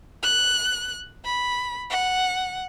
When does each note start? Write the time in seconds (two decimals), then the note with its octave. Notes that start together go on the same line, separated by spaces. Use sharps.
0.23 F#6
1.25 B5
1.90 F#5